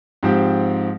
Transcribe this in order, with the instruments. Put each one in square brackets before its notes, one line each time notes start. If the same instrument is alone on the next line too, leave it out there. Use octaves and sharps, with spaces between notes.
[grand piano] G#2 F3 C4 G4